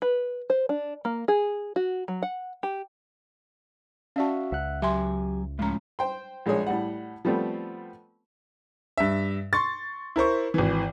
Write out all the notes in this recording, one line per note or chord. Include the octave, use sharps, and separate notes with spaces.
B4
C5
D4
A#3
G#4
F#4
F#3
F#5
G4
C#4 F#4 D5 E5 F5 A5
C#2 E5 F#5 F#6
F#3 G4 E5 G#5 C6
A2 F3 G#3 C#4 A#5
C5 G5 C6
A#1 G#3 D4 G#4 C#5
A2 G3 F#5
F3 G3 A3 B3 C4
G2 E5
C6 C#6 A6
E4 A#4 C5 C#6
G#1 E3